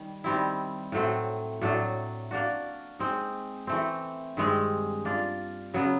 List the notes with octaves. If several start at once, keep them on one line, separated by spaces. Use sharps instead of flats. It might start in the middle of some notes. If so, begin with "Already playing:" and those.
Already playing: D#3 G3
D#3 G3 C4 E4
A2 F#3 A3 C4
A2 F#3 A3 D4
A#3 D4 F#4
G#3 C4 D#4
E3 A3 C4
G2 D#3 G#3 C4
A#3 D4 F4
C#3 F#3 B3